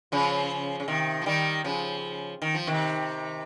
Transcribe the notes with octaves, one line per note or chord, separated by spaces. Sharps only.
C#3 F3
C#3
C3 D#3
F3
D#3 G3
C#3 F3
D#3
F3
C3 D#3